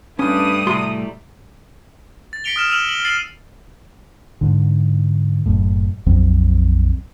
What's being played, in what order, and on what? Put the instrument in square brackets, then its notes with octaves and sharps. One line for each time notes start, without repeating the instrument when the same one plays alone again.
[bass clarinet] G2 [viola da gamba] G3 A3 [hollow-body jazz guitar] C#4 [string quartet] D#6
[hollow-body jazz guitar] A2 F#4 C6 [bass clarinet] C3
[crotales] A6
A#6 B6 C#7 D7 F7 G7
D#6 F6 E7
E6 F6 D#7 F7 F#7
F#7
A6 C7 D#7 F#7
[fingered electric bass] G#2 D3
F#1 F#2 A2
A#1 F2 F#3 C4